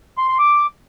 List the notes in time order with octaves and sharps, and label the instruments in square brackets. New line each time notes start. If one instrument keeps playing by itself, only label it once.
[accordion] C6
C6
D6